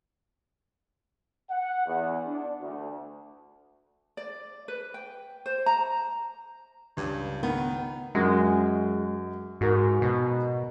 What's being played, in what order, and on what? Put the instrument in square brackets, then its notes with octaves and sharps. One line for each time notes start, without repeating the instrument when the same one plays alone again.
[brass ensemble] F#5
E2
D4
D2
[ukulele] D5
B4
G5
C5
A#5
[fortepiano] C#2 [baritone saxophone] G2
[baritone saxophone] D#3 [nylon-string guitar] B3
[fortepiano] F#2 [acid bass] G#3
[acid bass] G#2 [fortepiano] F#4 A#4
[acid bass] B2